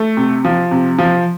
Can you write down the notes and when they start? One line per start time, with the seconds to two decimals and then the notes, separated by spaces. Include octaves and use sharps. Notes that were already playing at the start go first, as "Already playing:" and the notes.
Already playing: A3
0.17 C3
0.45 F3
0.71 C3
0.98 F3